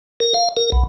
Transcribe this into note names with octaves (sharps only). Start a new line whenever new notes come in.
A#4
F5
A#4
B1